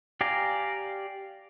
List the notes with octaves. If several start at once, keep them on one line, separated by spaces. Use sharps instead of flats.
G4 D5 F5 G#5 A#5